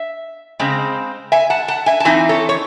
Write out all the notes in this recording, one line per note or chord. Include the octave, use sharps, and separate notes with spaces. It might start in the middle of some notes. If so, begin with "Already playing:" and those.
Already playing: E5
C#3 G#3 C4
E5 G#5
F#5 A5
F#5 A5
E5 G#5
A5
E3 C4 D#4 E5 G#5
A4 C#5
C#5